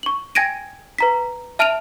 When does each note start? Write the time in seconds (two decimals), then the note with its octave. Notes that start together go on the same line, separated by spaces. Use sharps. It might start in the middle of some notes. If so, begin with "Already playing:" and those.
0.03 C#6 F#7
0.35 G5 G#5 G#6 A#6 D7 D#7
0.98 B4 A#5 B6
1.59 E5 A5 F6 D7 D#7 F7